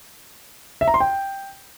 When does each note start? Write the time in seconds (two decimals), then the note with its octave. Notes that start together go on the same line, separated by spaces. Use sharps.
0.81 E5
0.88 A#5
0.94 C6
1.00 G5